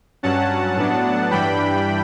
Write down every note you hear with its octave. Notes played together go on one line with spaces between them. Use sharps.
G2 F#3 C#4 F#5 A5
A2 F#3 B3 D4
G2 E3 G3 D4 G5 B5